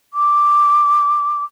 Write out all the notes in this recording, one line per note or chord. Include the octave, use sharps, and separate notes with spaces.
D6